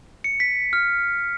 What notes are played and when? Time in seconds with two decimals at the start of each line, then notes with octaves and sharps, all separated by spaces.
0.24 C#7
0.40 B6
0.73 F6